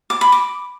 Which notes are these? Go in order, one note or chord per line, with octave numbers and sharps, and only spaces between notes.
D6
B5
D6